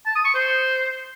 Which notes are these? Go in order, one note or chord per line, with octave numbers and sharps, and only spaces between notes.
A5
D#6
C#6
C5